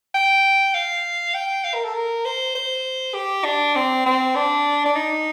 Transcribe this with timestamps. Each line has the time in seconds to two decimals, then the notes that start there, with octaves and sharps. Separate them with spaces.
0.14 G5
0.74 F5
1.34 G5
1.64 F5
1.74 A#4
1.84 A4
1.94 A#4
2.25 C5
2.55 C5
3.14 G4
3.44 D4
3.75 C4
4.06 C4
4.35 D4
4.86 D4
4.96 D#4